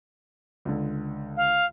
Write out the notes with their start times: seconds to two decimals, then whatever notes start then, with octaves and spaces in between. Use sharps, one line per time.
0.65 C#2 D3
1.37 F5